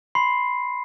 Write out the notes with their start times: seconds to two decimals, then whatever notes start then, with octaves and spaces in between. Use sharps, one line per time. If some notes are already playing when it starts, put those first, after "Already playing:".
0.15 B5 C6 C7